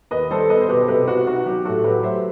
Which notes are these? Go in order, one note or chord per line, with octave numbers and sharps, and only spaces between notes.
D#2 B4 D#5
G3 A4 C5
B3 B4 D#5
C5
B2 G4 B4
A4
C2 G4 B4
B3 F#4
D#4 F#4
F#3 G4
A2 F#4 A4
F#3 G4 B4
A3 C5 E5